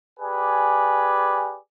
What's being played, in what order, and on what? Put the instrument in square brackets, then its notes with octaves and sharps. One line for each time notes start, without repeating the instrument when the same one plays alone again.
[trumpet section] G4 G#4 B4 D5 G#5